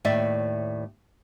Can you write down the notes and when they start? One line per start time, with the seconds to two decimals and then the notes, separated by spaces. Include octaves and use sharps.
0.05 D#2 A2 D5 E5